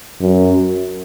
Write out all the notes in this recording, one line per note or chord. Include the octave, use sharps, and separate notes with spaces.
F#2